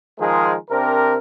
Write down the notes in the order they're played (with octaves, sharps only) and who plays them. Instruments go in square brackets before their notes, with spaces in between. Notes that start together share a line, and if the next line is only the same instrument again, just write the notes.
[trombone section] D#3 F3 G#3 G#4 A#4 C5
C3 C4 D4 A#4